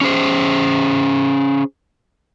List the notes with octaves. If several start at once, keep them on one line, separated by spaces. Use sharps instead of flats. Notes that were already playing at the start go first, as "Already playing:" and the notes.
C#4 G#4 C5